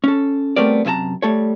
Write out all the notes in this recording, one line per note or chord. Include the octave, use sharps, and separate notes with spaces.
C#4 A4
G3 A3 B3 C4 A#4 D5
F#2 C3 D#4 A5 A#5
G3 A3 A4 C#5